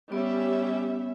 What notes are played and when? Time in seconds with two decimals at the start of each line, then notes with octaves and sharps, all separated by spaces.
0.12 G3 B3 C#4 E5